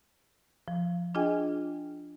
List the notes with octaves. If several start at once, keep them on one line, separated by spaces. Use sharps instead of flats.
F3
D4 F4 G#4 D#5 G5 G#5